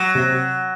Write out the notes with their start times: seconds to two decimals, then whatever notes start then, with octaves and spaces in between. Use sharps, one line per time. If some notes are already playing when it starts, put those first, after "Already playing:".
Already playing: F#3
0.15 C3